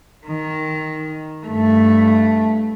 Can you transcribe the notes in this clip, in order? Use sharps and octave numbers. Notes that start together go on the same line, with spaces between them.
D#3
G2 A3